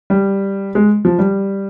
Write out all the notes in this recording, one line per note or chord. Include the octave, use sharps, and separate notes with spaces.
G3
G#3
F3
G3